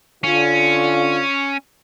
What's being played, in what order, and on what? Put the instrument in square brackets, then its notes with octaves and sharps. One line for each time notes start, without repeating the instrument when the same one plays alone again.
[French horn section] D3 F4 [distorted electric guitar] C#4